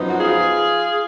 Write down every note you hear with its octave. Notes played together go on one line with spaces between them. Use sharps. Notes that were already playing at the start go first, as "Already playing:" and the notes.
Already playing: F#2 F3 B3 D#4
F#4
F4 G#4